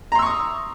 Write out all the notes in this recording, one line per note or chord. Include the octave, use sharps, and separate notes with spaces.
A#5 C6 C#6 D#6 E6